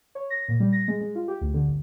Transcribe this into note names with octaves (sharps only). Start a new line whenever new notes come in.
C#5
A#6
A#2
G3
A#6
G#3
G#3
F4
G4
D2
D3
G1